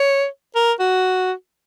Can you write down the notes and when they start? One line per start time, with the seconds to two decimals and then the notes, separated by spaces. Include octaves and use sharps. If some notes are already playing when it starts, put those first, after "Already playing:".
Already playing: C#5
0.55 A#4
0.80 F#4